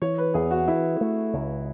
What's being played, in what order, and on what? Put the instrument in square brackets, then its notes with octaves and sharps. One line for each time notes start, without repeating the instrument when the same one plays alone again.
[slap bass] E3 [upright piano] C#5
[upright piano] B4
[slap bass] E2 [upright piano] G#4
[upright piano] F#4
[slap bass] E3 [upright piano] E4
[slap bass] A3
C#2